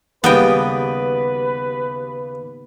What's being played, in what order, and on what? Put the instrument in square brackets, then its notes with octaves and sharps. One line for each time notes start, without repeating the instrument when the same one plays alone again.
[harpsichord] D#2 C#3 G3 [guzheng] B3 D#5 G5 [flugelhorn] B4